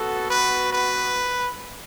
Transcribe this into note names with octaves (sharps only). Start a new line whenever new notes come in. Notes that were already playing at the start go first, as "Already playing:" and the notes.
Already playing: B3 F#4 A4
B4
B4